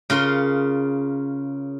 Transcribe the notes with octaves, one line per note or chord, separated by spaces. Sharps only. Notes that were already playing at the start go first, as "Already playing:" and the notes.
C#3 F4 A#4 C6